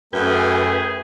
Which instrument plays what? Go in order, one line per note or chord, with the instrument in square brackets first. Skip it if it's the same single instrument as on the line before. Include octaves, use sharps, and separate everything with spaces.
[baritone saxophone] F#2 [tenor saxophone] A3 [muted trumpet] G#4 [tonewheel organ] B4 G5 G#5